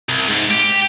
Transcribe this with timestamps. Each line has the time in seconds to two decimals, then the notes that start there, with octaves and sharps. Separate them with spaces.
0.09 C2
0.29 G#2
0.51 G4